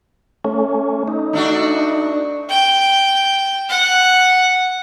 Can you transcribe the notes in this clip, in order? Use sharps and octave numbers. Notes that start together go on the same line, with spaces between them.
A3 C#4
D#4
A3 D4 F#4
G5
F#5